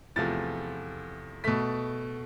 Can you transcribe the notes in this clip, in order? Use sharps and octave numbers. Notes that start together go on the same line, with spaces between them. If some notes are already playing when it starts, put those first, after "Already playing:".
E2 C3 F3 A3 A6
B2 A3 B6